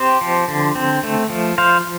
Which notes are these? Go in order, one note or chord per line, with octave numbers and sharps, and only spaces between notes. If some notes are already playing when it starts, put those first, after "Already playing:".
Already playing: C4 G4 C5
F3
D3
C4
A3
F3
F3 C5 F5